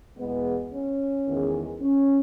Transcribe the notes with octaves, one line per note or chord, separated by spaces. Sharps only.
E2 B2 G#3 B3
C#4
E2 D#3 G#3
C#4